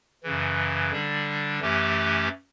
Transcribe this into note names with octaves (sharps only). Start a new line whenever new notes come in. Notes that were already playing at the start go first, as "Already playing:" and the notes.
F#2 C#3 E3
D3 G3 D4
F#2 E3 A3 C#4 G4